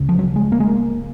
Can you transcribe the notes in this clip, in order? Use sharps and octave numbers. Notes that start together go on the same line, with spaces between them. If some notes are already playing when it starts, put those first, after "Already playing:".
Already playing: C#2 C#3
F3
F#3
G#3
A#3
G#3
A#3